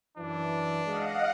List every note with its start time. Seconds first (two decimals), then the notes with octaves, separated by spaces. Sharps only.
0.18 F#2 E3 D4
0.85 G#3 D#5 F5 F#5